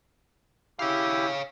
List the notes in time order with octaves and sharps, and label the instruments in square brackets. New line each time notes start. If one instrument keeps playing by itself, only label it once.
[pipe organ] E4 G4 [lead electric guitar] C#5 F5